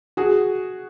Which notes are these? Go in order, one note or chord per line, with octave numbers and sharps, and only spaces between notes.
F#4 G#4